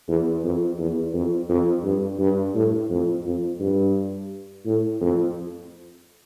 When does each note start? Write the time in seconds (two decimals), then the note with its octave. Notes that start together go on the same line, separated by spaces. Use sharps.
0.08 E2
0.44 F2
0.79 E2
1.14 F2
1.49 F2
1.84 G2
2.19 G2
2.55 A2
2.90 F2
3.25 F2
3.60 G2
4.66 A2
5.01 F2